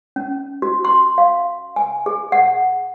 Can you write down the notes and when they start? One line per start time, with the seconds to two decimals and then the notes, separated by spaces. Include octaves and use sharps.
0.16 C#4
0.62 F#4
0.85 C6
1.18 F5
1.76 G#5
2.06 G#4
2.32 F#5